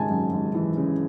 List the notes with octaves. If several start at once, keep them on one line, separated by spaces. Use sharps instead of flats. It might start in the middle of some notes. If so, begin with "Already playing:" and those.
Already playing: G#1 C#3 G#5 A5
F#2
G#1
E3
C#3